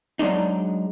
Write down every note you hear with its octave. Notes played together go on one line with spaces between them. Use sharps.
F#3 G#3 D4 D#4